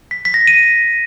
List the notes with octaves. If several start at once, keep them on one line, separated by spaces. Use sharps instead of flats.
B6
B6
A#6
D#7